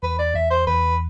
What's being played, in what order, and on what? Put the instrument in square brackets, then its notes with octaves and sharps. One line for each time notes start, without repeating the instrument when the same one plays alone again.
[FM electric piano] E2 [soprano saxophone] B4
[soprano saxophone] D5
[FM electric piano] E2 [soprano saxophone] E5
[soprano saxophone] C5
[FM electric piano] E2 [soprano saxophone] B4